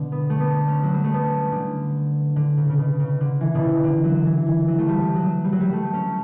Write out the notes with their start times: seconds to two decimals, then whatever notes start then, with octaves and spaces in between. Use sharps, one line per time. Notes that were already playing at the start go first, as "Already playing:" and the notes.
Already playing: B2 D3
0.12 B3
0.30 A3
0.40 B3
0.68 C#4
0.83 F#3
0.94 G3
1.04 A3
1.14 B3
1.24 C#4
1.52 D3
2.36 D3
2.57 C#3
2.69 C#3
2.78 B2
2.99 C#3
3.21 D3
3.41 E3
3.55 B2
3.62 C#3
3.84 D3
4.04 F#3
4.25 E3
4.47 E3
4.68 F#3
4.79 A3
4.89 G3
5.16 F#3
5.44 G3
5.52 F#3
5.60 G3
5.73 A3
5.94 C#4